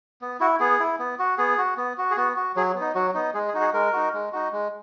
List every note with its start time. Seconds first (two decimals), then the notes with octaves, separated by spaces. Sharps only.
0.22 B3
0.40 E4 F#4
0.60 B3 G#4
0.80 E4
0.99 B3
1.19 F#4
1.38 B3 G#4
1.58 F#4
1.77 B3
1.98 F#4
2.11 G#4
2.17 B3 F#4
2.36 F#4
2.56 F#3 G#4
2.75 B3
2.81 D#4
2.95 F#3 F#4
3.14 B3 D#4
3.34 G#3 G#4
3.48 G#4
3.54 D#4 F#4
3.61 G#4
3.73 G#3 A#4
3.93 D#4 F#4
4.13 G#3
4.32 D#4 F#4
4.52 G#3